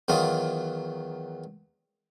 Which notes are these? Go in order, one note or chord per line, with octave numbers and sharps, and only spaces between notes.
E2 D#3 F#3 F4 D#5